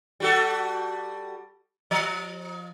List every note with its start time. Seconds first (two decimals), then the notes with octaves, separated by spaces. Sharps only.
0.20 G3 F#4 A4
1.91 F3